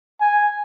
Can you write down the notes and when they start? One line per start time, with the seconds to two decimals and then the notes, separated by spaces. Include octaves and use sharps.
0.20 G#5